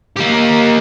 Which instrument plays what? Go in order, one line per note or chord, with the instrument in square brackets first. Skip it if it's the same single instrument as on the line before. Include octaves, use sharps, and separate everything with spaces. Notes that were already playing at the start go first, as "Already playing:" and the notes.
[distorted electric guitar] A#3 G4